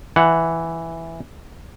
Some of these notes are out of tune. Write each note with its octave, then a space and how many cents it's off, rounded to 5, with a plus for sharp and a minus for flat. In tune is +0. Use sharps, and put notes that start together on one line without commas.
E3 +0 F#5 +0